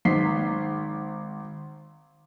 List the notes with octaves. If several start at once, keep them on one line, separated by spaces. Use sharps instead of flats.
G#1 D#4 B6 C7